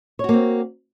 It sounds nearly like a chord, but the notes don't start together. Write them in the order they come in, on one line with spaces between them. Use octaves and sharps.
C#5 F#4 A#3 C4